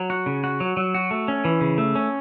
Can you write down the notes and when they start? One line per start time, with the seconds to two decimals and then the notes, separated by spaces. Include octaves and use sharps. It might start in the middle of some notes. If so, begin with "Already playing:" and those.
Already playing: F#3
0.10 F#4
0.26 C#3
0.44 F#4
0.60 F#3
0.77 F#3
0.95 F#4
1.11 A3
1.28 C#4
1.45 E3
1.61 C#3
1.78 A3
1.95 C#4